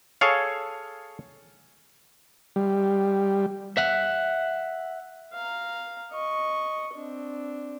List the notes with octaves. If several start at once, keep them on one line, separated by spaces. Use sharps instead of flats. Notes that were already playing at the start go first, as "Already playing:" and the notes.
G#4 A4 C#5 F5
G3
E5 F#5
F5 A#5
D#5 C#6
C4 D4